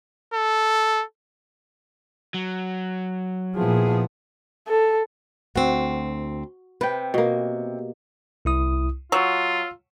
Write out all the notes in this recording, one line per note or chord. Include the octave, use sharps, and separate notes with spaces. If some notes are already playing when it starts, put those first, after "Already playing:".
A4
F#3
A#2 F3 B3 E4 G#4
A4
D2 C4 F#4
C3 B4 G5
B2 A#3
C2 E4 D#6
F#3 F4 E6